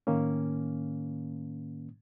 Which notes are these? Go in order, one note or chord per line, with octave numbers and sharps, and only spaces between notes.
A2 D#3 A#3 C#4